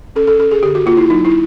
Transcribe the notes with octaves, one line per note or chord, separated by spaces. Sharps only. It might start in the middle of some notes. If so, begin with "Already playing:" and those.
C#4 A4
A4
C#4 A4
G#4
D3 G4
F#4
A#3 F4
E4
F#3 D#4
E4